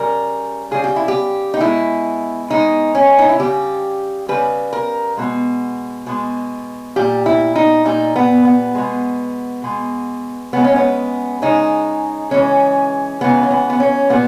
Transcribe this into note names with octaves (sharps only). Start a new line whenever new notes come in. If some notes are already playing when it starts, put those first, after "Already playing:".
Already playing: C#3 G3 A#4
C#3 G3 G#4
G4
E4
G4
D#4
B2 G#3 E4
B2 G#3 D#4
C#4
D#4
E4
C#3 G3 G4
C#3 G3 B4
A#4
B2 G#3
B2 G#3
A#2 G3 G4
E4
D#4
A#2 G3 D#4
B3
B3
B2 G#3
B2 G#3
C#3 G#3 B3
C#4
B3
C#3 G#3 D#4
C#3 E3 G#3 C#4
C#3 E3 G#3 B3
C#4
B3
B3
C#4
A#2 G3 B3